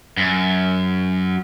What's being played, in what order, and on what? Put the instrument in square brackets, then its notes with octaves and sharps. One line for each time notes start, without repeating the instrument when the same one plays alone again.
[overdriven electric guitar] F#2